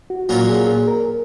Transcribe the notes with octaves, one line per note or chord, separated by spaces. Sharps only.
F#4
A#2 F#3 C#4 F4 F#4 A#4
G#4
G#4
A#4